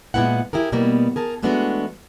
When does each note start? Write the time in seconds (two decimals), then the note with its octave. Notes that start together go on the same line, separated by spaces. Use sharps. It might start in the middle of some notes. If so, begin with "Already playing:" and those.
0.14 A#2 G#3 B3 E4 F#5
0.53 E4 G4 G#4 A#4
0.72 B2 G3 A#3 B3
1.16 G#4 A#4 A5
1.42 E3 G#3 A3 B3 D4 F#4